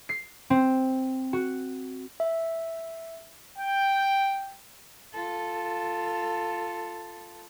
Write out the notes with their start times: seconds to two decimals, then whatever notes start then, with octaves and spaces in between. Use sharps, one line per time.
0.09 C7
0.50 C4
1.33 F#4
2.20 E5
3.58 G5
5.13 F4 A4